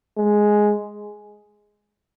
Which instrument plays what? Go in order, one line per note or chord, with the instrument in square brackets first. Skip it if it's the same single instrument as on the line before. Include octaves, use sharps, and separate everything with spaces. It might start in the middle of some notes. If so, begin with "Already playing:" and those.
[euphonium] G#3